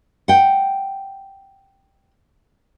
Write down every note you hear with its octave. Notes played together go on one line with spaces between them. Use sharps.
F#5 G5